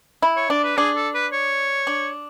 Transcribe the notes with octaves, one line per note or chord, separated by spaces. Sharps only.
E4
C#5
D4 D5
B4
D4 G#4
A4
B4
C#5
D4